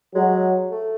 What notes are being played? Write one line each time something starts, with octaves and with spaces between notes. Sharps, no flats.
F#3 G#3
A3